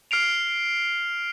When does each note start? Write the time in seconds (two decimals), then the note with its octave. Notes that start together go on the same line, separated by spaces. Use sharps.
0.11 F6 C7 D7 F7